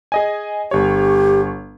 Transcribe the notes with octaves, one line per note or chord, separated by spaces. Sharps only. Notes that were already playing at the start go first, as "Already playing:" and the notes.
G#4 D#5 G#5
G1 G4 C#5